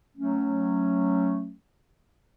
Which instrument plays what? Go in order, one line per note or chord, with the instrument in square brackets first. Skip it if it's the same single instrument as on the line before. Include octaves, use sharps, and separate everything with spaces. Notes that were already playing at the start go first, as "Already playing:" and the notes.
[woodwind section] F#3 A3 C#4